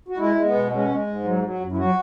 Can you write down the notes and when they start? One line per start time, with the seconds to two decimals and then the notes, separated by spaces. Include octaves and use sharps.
0.08 F#4
0.17 G#3 E4
0.35 G#3
0.44 B3
0.54 B2
0.71 G#3 C#4
0.89 G#3
1.07 G#2
1.24 F#3
1.42 F#3
1.60 F#2
1.72 E4
1.77 F#3 F#4